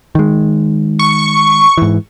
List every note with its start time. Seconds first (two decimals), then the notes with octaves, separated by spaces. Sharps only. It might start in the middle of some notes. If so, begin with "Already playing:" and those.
0.15 D#3 G#3
0.99 C#6
1.78 G#2 E3